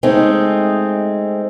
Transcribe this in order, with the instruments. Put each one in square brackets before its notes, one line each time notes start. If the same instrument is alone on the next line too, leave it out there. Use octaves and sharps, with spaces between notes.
[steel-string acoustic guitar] G#3 A3 C4 D#4